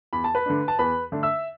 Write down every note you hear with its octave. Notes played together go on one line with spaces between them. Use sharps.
E2 B5
A5
B4 B5
D3 A3 D4
A5
E2 B4 B5
D3 A3 D4
E5 E6